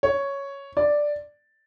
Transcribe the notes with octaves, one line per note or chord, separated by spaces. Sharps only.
C#5
D5